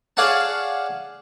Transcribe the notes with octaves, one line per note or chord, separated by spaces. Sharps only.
G#4 C#5 D5 F5 F#5 A5